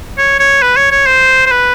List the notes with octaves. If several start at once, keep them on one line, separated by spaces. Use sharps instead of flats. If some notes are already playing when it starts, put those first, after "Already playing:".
C#5
C#5
B4
C#5
C#5
C5
C5
B4